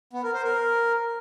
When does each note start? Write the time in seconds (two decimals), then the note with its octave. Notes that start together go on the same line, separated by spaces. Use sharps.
0.13 B3
0.23 A#4
0.33 C5
0.44 A#4